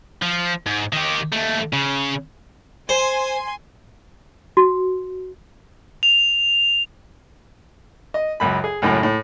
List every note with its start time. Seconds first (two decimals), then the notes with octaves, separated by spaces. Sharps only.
0.22 F3
0.66 G#2
0.93 D#3 G4
1.33 D#2 A3
1.73 C#3
2.89 C5 G#5 C6
4.57 F#4
6.03 F7
8.14 D#5
8.40 C#2 F#2 B5
8.64 G#4
8.82 C#2 F#2 A2
9.03 A2